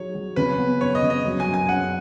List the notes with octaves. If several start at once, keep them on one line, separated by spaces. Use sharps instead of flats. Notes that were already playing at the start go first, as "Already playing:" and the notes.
Already playing: F#3 D#4 G#4 C#5
F#3
C#3 B4
B3
F#2 C#5
D#5
C#3
D#5
F#3
G#5
F#2
G#5
F#2 F#5